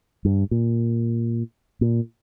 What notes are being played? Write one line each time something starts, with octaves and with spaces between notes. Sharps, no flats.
G2
A#2
A#2